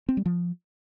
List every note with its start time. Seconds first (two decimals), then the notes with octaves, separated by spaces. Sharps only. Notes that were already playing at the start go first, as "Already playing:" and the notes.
0.09 C4
0.17 G3
0.26 F3